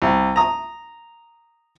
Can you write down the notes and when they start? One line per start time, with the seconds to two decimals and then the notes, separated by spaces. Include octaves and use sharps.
0.02 C2
0.36 A#5 D#6